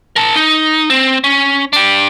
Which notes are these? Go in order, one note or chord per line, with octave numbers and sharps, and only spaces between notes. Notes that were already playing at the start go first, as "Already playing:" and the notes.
A#4 A5
D#4
C4
C#4
D4 G4